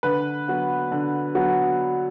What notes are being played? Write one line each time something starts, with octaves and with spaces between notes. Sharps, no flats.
D3 B4
F#3 B3
D3
F#3 B3